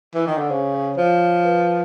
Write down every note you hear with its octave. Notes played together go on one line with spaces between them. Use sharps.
E3
D#3
D3
C#3 C5
C#5
F3 C5
B4